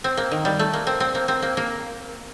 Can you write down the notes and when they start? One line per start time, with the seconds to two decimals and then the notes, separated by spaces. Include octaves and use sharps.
0.04 C4
0.17 A#3
0.31 D#3
0.45 G3
0.59 A3
0.73 A#3
0.87 C4
1.00 C4
1.15 A#3
1.28 C4
1.42 A#3
1.57 A#3